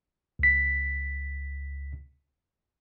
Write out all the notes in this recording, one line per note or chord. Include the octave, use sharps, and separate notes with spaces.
C#2 B6